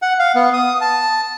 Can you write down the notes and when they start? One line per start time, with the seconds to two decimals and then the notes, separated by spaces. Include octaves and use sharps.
0.02 F#5
0.19 F5
0.35 B3
0.53 D#6
0.81 A5